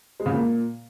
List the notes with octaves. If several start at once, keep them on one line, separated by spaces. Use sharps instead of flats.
G#3
C#3
A#2